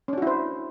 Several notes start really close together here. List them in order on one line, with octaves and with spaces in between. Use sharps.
C#4 D4 F#4 E4 C5